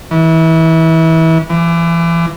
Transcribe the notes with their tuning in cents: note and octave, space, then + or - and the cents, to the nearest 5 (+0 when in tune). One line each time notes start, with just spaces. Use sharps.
E3 -25
E3 +35